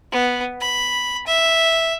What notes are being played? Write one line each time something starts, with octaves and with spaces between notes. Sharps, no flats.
B3
B5
E5